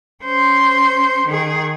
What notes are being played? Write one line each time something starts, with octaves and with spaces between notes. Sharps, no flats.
C#4 C5
D#3 G#4